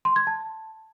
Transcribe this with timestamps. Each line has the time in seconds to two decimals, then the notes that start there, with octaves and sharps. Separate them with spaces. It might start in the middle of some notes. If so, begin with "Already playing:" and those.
0.05 C6
0.16 G#6
0.27 A5